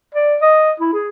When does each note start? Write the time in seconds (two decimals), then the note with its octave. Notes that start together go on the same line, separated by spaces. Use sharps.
0.15 D5
0.42 D#5
0.80 E4
0.93 G#4